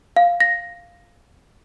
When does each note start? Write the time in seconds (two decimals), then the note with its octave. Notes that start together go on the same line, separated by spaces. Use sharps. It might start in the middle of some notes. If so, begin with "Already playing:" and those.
0.16 F5
0.40 A#6